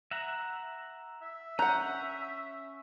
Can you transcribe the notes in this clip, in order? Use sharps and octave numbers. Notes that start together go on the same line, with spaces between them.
E5 F#5 A#5
E5
C#4 F#5 A#5 F#6 G6